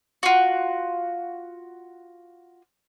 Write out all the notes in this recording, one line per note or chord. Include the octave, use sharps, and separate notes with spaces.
F4 F#4